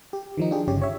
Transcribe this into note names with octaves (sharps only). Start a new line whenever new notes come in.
G4
D#3 F3 D#4
D4 F4 G4 G#4
G1 C#3 G4 C#5
C#5 E5